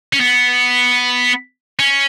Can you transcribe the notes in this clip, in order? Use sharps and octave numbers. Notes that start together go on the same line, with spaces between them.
C#4
B3
C#4